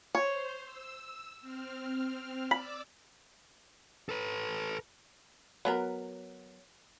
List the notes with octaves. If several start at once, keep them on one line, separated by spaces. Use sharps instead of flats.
C5 C#5
E6
C4 F6
D5 B5 D6 E6
A4 B4
F#3 B3 A#4